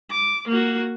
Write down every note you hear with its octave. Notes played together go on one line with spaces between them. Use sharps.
D6
A#3 F#4